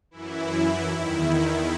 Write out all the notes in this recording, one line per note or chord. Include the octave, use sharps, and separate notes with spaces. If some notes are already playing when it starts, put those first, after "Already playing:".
F#2 E3 E4
E2 D#3 E4